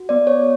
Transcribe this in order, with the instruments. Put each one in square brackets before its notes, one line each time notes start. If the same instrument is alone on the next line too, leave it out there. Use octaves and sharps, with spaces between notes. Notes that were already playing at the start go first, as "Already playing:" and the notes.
Already playing: [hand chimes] F#4
B3 D5
C#5